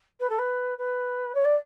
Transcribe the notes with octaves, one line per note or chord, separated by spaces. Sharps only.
B4
A4
B4
B4
C#5
D5